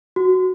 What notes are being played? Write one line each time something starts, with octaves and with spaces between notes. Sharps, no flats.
F#4